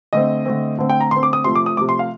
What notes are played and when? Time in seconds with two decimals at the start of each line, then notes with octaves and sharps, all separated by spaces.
0.13 D3 A3 C4 D#5
0.46 D3 A3 C4
0.78 D3 A3 C4
0.90 G5
1.00 A#5
1.11 D3 A3 C4 C6
1.23 D6
1.33 D#6
1.44 C3 F3 A3 C6
1.55 D6
1.66 D#6
1.77 C3 F3 A3 D6
1.89 C6
1.99 F5